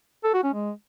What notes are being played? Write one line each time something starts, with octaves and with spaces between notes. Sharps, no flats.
A4
F#4
C#4
G#3